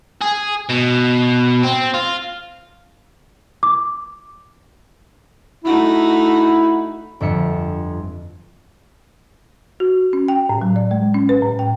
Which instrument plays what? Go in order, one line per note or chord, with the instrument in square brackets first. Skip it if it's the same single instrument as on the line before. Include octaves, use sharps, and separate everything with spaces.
[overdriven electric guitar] G#4
B2
C4
F4
[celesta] D6
[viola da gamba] A3 D#4 F#4 [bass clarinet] E4
[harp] G1 F2 E5 C#7
[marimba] F#4
C#4
G5
A2
F#3
D5
G#3
C#4
B4
A2
G5